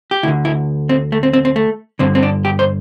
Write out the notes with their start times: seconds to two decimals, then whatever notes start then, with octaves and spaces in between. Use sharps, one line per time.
0.11 G4
0.23 D2 E4
0.28 D3
0.45 E4
0.89 C4
1.12 A3
1.23 C4
1.33 C4
1.45 C4
1.56 A3
1.99 G2 D3 C4
2.15 C4
2.23 D4
2.45 G4
2.59 C5